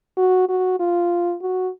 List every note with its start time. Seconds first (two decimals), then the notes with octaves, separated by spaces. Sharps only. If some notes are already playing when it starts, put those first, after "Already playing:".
0.17 F#4
0.49 F#4
0.80 F4
1.42 F#4